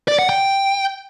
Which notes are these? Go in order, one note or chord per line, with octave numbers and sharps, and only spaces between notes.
D5
F#5
G5